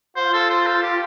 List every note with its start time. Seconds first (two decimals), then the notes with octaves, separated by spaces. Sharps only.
0.16 F4 C5
0.34 A4
0.50 C5
0.66 A4
0.83 G4